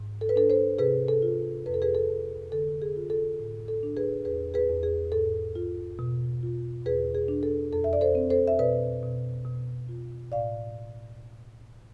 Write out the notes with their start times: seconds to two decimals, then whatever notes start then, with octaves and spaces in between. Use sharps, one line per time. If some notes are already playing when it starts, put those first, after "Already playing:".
Already playing: G#2
0.21 A4
0.29 B4
0.36 D4 A4
0.50 A4 C5
0.79 C3 G#4 B4
1.08 A4
1.22 F4
1.66 F2 B4
1.74 A4
1.82 G#4 B4
1.95 A4
2.09 F2
2.52 D3 A4
2.82 G#4
2.96 F4
3.10 A4
3.40 A2
3.68 A4
3.83 D4
3.97 G#4 B4
4.25 E2 G#4 B4
4.54 G#4 B4
4.69 E2
4.83 G#4
5.12 G#2 A4
5.55 F4
5.99 B2
6.43 F4
6.85 E2 G#4 B4
7.15 G#4
7.28 D4
7.43 A4
7.73 F2 A4
7.84 E5
7.93 D5
8.01 A4 C5
8.15 C4
8.30 A4 C5
8.48 E5
8.59 B2 B4 D5
9.03 B2
9.45 B2
9.89 F4
10.32 A2 D5 F5